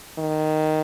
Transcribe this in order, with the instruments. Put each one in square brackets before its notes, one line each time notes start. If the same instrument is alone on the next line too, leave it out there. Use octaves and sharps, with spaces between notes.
[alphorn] D#3